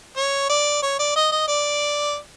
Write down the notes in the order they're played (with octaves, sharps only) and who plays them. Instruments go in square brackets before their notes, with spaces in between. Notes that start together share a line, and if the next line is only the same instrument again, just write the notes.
[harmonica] C#5
D5
C#5
D5
D#5
D#5
D5